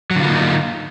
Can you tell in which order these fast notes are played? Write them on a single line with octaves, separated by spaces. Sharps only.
F#3 D3 F4 A#3 D#4